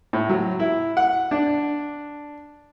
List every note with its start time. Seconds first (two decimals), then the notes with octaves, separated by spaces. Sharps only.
0.13 A2
0.29 F#3
0.59 E4
0.97 F#5
1.31 D4